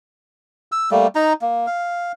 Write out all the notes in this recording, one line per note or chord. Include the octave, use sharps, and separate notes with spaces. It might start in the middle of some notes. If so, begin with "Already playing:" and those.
E6
G3 A3 A#3
D#4 A#5
A#3
F5